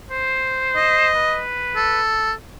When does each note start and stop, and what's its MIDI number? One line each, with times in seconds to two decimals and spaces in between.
0.11 1.10 72
0.76 1.40 75
1.16 2.01 71
1.76 2.32 69